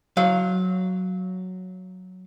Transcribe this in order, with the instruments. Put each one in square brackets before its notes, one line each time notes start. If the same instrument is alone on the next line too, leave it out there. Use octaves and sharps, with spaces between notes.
[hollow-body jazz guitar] F#3 F5